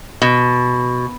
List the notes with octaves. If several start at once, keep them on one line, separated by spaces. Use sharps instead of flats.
B2